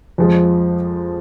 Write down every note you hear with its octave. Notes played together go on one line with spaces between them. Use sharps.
F2 F3 G#3